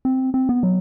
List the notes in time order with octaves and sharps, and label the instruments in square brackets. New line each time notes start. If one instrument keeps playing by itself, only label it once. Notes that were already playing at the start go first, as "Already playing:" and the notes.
[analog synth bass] C4
C4
B3
F#3